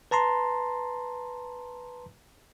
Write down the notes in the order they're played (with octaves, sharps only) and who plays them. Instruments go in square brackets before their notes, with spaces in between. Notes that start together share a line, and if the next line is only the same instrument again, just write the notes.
[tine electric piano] B4 A5 A#5 C6